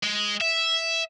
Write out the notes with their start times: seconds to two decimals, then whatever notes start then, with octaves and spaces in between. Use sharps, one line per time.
0.04 G#3
0.41 E5